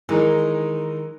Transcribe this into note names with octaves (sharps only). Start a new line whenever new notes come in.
D#3 E3 G#3 D#4